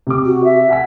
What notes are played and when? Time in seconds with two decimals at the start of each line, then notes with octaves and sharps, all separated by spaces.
0.07 C3 D6
0.26 F#4
0.44 E5
0.69 F#5 G#5 B6